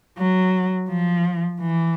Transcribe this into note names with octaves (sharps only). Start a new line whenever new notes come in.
F#3
F3
E3